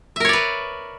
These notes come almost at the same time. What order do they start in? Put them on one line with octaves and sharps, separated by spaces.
E5 A#4 C#5 D5 B4